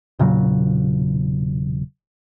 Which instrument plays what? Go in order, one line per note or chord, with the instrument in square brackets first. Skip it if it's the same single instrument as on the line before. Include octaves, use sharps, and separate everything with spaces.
[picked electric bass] E1 A#2 C#3 F#3